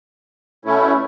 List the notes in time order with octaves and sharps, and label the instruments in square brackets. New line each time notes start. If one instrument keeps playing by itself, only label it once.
[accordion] B2 A3 C#4 E4